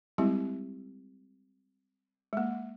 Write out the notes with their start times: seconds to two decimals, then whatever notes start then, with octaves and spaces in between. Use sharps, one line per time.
0.18 G3 G#3 C4 E4 G4
2.33 G#3 A#3